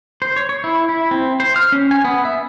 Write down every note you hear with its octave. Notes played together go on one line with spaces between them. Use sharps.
C5
C#5
C#5
E4
E4
C4
C5
F6
C#4
G#5
B3
E5